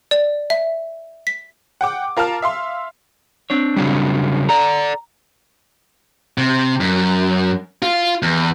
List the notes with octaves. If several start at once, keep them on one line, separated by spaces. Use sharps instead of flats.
D5
E5
B6
F#5 G5 D6
F4 A#4 F5 A5 F6
E5 F5 C6
C4 D4 C#5
C#3 F#3 G3
A4 D5 A#5
C3
F#2
F4
E2